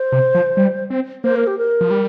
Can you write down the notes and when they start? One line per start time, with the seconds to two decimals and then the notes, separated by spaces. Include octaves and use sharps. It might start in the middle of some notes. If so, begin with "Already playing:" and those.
Already playing: C5
0.12 C3
0.35 F3
0.57 G3
0.90 C4
1.24 A#3 C5
1.36 A#4
1.47 G4
1.58 A#4
1.81 F3
1.91 G3